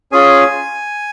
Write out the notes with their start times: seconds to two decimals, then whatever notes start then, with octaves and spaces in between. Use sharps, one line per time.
0.12 C#4 F4 G#4 G#5